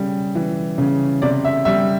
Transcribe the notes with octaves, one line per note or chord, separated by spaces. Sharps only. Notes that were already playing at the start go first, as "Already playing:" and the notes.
Already playing: C#3 G3
E3
C#3
C3 D5
E5
G3 E5